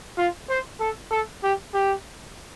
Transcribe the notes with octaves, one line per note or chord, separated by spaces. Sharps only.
F4
C5
A4
A4
G4
G4